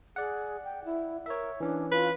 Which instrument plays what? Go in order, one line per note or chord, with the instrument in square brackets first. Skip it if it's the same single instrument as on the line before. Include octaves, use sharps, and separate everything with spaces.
[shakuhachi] G#4 [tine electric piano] D5 F#5
[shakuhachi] G5
E4
[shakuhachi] A#4 [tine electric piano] C#5 E5
[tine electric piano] E3 C#4 [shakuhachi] D4
[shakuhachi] F4 [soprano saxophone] B4